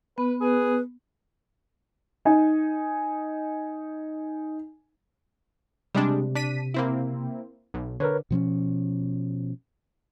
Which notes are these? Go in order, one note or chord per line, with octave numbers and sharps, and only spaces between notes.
B3 B4
G#4 B4
D#4 G#5
C3 G3 G#3 D4
D4 B6 D#7
A#3 C4 E4
B1
D3 A#4 B4 C#5
B2 F3 C4 C#4